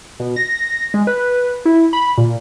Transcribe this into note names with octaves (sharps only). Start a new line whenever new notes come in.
B2
A#6
G#3
B4
E4
B5
A#2